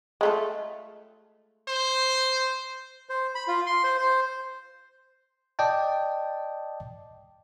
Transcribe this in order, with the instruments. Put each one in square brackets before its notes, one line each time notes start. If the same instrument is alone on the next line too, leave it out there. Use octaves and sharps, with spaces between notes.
[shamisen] G#3 A3 F4
[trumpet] C5
[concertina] C5
B5
F4
C6
C5
C5
[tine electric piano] D5 D#5 G5 A5